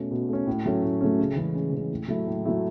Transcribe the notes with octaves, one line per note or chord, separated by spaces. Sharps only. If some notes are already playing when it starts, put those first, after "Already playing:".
Already playing: B2 A3 C#4
B2
A3 C#4
A2
F#3 A3 C#4
A2
F#3 A3 C#4
C#3
E3 G#3 C#4
C#3
E3 G#3 C#4
A2
F#3 A3 E4
A2
F#3 A3 E4